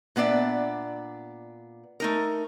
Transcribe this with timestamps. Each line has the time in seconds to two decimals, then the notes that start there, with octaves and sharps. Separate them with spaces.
0.16 A#2 B3 D4 D5 E5
2.00 A3 D#4 A#4